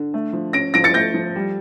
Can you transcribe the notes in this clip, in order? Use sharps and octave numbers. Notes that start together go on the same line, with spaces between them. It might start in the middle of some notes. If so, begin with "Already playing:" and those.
Already playing: D3
A3
F3
C#4 A#6 D7
F3 A#6 D7
A6 C#7
A3 G6 A#6
F3
G3